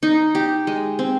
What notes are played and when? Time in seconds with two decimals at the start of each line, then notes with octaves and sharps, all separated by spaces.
0.03 D#4
0.35 G4
0.67 G#3
0.99 C4